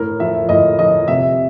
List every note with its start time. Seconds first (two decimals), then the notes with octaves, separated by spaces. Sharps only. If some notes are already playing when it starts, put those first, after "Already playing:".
Already playing: A2 A#4
0.20 F3 E5
0.49 A2 D#5
0.79 F3 D#5
1.08 C3 E5